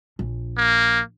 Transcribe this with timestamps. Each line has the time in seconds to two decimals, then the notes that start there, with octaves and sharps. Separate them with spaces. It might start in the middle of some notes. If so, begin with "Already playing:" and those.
0.19 A#1
0.57 A#3